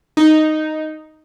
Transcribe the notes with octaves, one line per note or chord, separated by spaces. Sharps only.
D#4